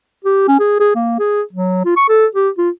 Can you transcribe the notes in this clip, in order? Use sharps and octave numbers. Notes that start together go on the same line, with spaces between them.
G4
C#4
G#4
G#4
A#3
G#4
F#3
F4
C#6
A4
G4
F4